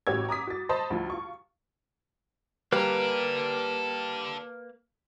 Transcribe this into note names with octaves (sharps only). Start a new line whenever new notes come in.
A1 F#4 G4 C#5 E6 G#6
A#5 D6 D#6 B6
F#4 A6
C5 D#5 A5 B5
D2 F3
F4 C#6
G3 A#3 A4 B4 D5 A#5